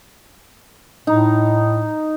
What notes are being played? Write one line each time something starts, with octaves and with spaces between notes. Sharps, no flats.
A2 D#4